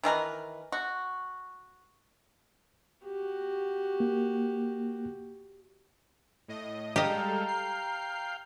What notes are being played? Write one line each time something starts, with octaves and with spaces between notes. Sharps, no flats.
D#3 E3 A#4 B4
F#4
F#4 G4
A#3
A2 D#5
G3 G#3 G4 A4 D#5 F5 G5 A#5
C7